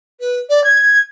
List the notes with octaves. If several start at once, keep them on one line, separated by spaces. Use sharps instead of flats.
B4
D5
G#6